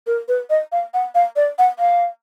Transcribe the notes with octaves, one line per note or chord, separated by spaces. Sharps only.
A#4
B4
D#5
F5
F#5
F5
D5
F#5
F5